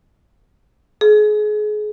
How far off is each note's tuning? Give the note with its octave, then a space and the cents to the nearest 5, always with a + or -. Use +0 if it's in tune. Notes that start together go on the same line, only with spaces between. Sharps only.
G#4 +30